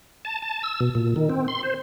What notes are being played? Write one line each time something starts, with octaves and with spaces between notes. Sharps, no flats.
A5
A5
E6
B2
A#2
D#3
C4
C6
C5